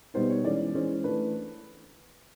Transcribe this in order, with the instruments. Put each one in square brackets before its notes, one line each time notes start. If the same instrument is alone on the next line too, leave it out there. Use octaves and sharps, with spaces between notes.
[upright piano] B2 G3 B3 D#4 C5
C#5
E3 G#3 C#4 D5
E3 G#3 C#4 C5
E3 A3 D4 B4